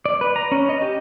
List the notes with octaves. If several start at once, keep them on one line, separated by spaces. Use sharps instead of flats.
D5
B4
A#5
C#4
D#5
G4